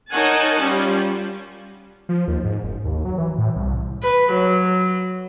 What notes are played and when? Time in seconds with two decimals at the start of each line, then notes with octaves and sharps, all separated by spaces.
0.11 D#4 A#4 C#5 F#5 G#5 A5
0.60 G3 C#4 F4
2.09 F3
2.28 D#2
2.44 G#2
2.64 F#1
2.84 D#2
3.05 F#3
3.18 E3
3.38 A2
3.56 C2
4.02 B4
4.32 F#3